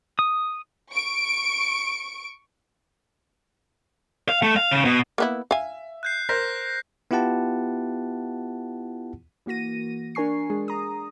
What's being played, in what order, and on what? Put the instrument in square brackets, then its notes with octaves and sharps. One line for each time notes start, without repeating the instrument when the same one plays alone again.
[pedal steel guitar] D#6
[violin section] C#6 D7
[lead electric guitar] F5
A3
F5
C#3
B2
[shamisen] A#3 B3 E4
[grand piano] E5 [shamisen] F5 G#5
[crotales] F#6 G6 C7
[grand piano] A#4 C5 [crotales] G6 A#6 B6
[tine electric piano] B3 E4 F4 G4 F#5 A5
[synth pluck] E3 A#3 F#4 A#6 D#7
D4 A#4 G#5 C#6 C7
G#3 D4 G#4
A#5 D#6